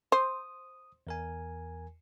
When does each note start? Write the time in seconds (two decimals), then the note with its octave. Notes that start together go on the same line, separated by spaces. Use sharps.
0.12 C5 D#6
1.07 E2 A#4 G#5